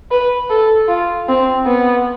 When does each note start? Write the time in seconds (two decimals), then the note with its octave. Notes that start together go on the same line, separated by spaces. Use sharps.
0.11 B4
0.50 A4
0.88 F4
1.28 C4
1.66 B3